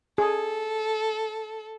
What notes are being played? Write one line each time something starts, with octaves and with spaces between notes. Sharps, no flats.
G#4 A4